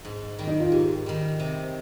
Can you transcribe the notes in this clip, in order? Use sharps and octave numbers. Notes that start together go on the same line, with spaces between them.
G#2
D#3 G3
D#4
F4
G#2 G4
D#3 G3
C3